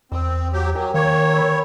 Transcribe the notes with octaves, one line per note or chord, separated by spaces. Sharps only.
E2 C4 D#6 E6
F#3 G4
F#3 A#4 G5 G#5
D#3 A#3 C5 C#5 D6
B4 E6